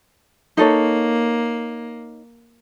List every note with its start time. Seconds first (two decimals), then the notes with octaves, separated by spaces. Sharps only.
0.57 A#3 D#4 A4 C#5